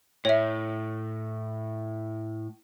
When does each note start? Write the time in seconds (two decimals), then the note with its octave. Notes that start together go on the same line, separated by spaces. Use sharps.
0.25 A2 C#5 E5